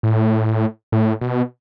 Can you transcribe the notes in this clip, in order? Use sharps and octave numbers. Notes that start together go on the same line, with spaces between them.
A2
A2
B2